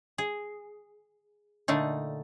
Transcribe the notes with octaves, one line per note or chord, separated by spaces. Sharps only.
G#4
A#2 D3 A3 D#4